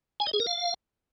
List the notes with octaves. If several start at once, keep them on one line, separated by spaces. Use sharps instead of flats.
G#5
D#5
G#4
A#4
F5